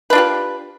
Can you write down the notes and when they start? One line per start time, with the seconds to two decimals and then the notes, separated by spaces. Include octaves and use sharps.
0.10 B4
0.13 D4
0.15 F4
0.18 G4